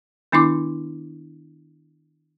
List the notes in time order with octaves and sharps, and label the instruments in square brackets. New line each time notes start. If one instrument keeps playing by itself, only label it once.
[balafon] D#3 B3 D4 E4 C6 D6